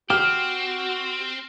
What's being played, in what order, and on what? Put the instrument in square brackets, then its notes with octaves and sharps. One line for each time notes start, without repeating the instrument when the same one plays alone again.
[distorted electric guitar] C4 [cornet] F#4 [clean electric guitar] G4 [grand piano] F6